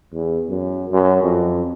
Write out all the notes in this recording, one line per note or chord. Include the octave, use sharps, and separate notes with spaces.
E2
F#2
F#2
F2